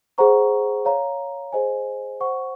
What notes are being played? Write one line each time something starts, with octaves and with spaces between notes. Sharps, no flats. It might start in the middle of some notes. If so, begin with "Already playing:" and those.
G#4 C5 F#5 A#5 C#6
C#5 F5 A#5
G#4 C5 D#5 G#5
C5 F#5 C#6